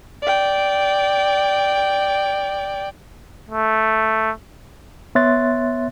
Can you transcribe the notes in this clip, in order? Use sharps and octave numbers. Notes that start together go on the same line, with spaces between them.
D5 G5
A3
B3 C#5 E5 C6 F#6 A6